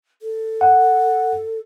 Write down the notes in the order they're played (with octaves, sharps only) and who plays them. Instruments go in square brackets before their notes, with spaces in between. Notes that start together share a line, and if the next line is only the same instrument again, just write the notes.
[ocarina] A4
[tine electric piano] F#5